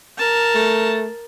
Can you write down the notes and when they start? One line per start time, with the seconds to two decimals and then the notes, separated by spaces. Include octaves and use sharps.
0.17 A#4 A5
0.55 A3